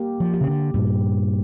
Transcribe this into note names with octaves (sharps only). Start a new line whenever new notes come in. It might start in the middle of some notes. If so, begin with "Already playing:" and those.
Already playing: A#3 G4
F3
G4
C#3
D3
G2 A#2